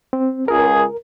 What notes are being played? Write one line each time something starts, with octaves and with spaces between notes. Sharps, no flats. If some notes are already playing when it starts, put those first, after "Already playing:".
C4
C#2 G#4 A#4